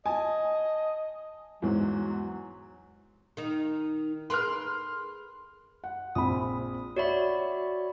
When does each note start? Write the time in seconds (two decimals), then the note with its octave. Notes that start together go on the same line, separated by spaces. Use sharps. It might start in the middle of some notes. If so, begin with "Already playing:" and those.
0.06 D#5 G#5 A5
1.62 E2 G#2 F#3
3.37 D#3 D#4
4.30 G#4 A#4 B4 C6 F6
5.84 F#5
6.15 A#1 C4 B5 D#6
6.96 F#4 C#5 D5 E5 B5